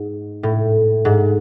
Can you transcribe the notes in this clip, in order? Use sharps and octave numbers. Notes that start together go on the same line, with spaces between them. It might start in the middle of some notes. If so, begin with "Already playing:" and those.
Already playing: G#2
A2
G#2